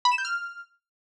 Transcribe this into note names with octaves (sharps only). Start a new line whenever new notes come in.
B5
E7
G6
F6